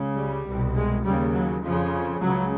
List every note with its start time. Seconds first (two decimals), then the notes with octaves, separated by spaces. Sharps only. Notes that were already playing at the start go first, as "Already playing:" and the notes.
Already playing: C#2 C#3
0.16 G3
0.46 C2 B2
0.76 G#3
1.04 D#2 C#3 G3
1.34 F#3
1.63 F2 C#3 F3
2.21 C#2 C#3 F#3